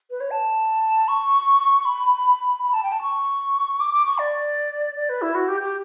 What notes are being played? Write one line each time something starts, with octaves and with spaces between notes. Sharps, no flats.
B4
C#5
A5
C#6
B5
B5
A5
G5
A5
C#6
D6
D6
C#6
D5
D5
B4
E4
F#4
G4
G4